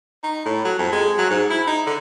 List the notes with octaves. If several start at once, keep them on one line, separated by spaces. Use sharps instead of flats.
D#4
A2
F#3
F2
G#3
F#3
G#2
E4
D#4
D3